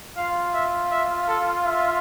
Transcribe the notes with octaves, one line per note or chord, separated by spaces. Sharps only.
F4 F5
E5
E5
A4
E5